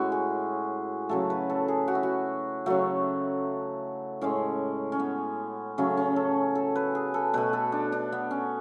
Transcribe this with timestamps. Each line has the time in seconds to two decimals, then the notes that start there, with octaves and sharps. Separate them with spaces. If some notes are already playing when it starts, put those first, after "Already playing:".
Already playing: A2 G#3 C#4 E4 F#4
0.12 G#4
1.09 C#3 F#3 A3 A4
1.30 B4
1.50 A4
1.68 G#4
1.88 F#4
1.95 E4
2.03 F#4
2.66 C#3 F#3 A3 F#4
4.21 A2 G#3 C#4
4.92 C#4
4.99 B3
5.78 C#3 F#3 A3 C#4
5.97 C#4
6.16 A4
6.55 A4
6.76 B4
6.95 G#4
7.14 A4
7.34 B2 A3 B4
7.53 A4
7.72 D4
7.92 D4
8.12 B3
8.31 C#4